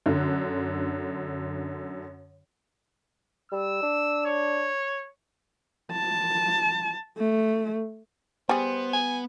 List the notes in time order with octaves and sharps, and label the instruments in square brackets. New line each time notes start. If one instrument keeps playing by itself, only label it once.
[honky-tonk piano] F#2 D3
[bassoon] G3 [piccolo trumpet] E6
[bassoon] D4
[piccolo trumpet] C#5
[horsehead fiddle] A5
A3
[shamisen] G3 G#4 [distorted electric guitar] B3 [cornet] C5
[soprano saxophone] G#5